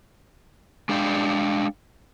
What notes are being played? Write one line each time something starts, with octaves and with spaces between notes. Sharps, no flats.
G#3 D4 F5 G5